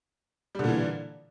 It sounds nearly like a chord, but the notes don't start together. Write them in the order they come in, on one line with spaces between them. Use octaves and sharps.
G3 D3 A#2 E3